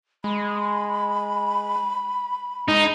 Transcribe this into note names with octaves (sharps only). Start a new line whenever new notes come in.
G#3 B5
G#3 D#4